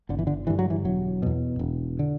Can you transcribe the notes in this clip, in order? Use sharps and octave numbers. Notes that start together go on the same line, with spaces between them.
G1 D3
E3
D3
G2 D3 E3
F#3
E3
E1 F#3
E2 B2
E1
D3